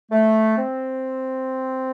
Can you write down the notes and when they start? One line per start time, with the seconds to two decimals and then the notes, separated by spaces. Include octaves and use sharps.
0.11 A3
0.57 C4